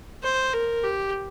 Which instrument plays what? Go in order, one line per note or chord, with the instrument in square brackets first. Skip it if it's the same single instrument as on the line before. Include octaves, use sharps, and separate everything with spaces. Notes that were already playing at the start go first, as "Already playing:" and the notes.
[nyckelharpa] C5
A#4
G4